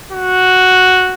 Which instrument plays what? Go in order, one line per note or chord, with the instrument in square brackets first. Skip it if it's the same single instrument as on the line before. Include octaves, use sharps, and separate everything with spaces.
[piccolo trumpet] F#4